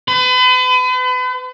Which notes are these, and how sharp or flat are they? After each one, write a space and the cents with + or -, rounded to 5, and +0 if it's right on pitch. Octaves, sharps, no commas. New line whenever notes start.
B4 +40